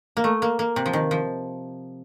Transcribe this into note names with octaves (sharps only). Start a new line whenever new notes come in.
A#3
A3
A#3
A#3
C3
F3
D#3
F3